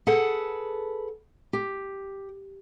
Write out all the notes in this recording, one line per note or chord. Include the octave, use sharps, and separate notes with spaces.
G#4 A4 B4 F#5 A5
G4